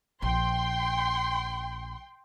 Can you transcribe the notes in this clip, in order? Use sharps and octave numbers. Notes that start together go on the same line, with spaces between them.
A#1 G5 C6